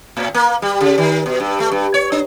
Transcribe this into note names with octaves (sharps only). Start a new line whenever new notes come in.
A2
A#3
G3
C#3
D#3
B2
G2
A3
G2
C#5
D4